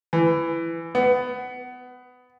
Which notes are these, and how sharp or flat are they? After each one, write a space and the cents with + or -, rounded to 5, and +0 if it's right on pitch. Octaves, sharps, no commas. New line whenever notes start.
E3 +15
B3 +20